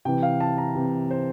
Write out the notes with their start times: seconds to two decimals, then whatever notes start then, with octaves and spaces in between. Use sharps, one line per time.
0.05 C3 E3 G5
0.23 F5
0.40 A5
0.58 A#5
0.75 C3 E3
1.11 C5